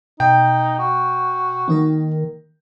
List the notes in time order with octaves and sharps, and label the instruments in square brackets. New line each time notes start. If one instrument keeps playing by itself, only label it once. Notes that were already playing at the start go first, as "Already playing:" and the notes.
[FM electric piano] B2 [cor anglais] D#4 [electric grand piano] G5
[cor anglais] F#4
[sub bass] D#3 [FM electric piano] A#3 D#4 A#4